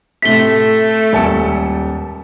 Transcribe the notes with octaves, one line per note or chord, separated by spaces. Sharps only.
A2 C3 A3 B6 G7
D#1 G#2 A5 C#7